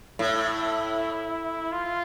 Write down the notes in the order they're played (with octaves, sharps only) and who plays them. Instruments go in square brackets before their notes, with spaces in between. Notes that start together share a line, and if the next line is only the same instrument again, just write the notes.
[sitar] A2 [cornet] E4
[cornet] F4